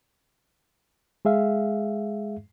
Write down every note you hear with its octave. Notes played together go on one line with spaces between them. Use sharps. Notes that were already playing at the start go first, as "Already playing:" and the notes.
G#3 G#4 E5 F5